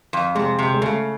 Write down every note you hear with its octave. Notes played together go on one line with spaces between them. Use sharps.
F2
C3 G#3
C3
G#3
C#3 A3